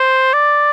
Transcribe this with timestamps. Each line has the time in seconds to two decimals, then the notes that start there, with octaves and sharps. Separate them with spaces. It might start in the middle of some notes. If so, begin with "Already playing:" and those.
Already playing: C5
0.33 D5